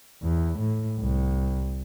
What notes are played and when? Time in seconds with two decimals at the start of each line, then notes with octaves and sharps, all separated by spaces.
0.23 E2
0.59 A2
1.00 C2